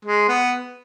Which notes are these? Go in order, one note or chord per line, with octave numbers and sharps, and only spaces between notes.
G#3
B3